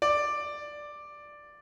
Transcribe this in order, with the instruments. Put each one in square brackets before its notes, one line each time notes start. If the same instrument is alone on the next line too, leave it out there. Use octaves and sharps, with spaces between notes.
[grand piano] D5